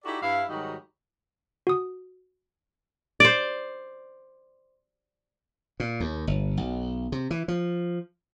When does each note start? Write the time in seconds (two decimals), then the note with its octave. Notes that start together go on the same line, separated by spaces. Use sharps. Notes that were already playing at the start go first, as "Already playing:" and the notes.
0.05 D#4 E4 F#4 G4 A4 D5
0.21 G2 E4 F5
0.49 G#2 D#3 F#3 G3 D#4 F#4
1.67 F#4 D#6
3.20 C5 D5
5.80 A#2
6.00 D#2
6.27 G1
6.57 B1
7.12 C3
7.31 E3
7.48 F3